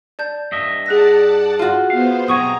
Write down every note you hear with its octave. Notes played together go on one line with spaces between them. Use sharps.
D5 A5 G6
G2 D#5 E5
G#4 D5 F#5 A5 F#6 A#6
F4 F#4
B3 C5 F5
B1 C3 F#5 G#5 A#5 C#6 D#6